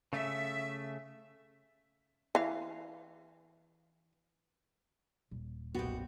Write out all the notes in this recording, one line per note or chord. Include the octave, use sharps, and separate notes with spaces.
C#3 A3 E5
E3 F5
D#1
B1 F#2 A#2 B3 F#4 G4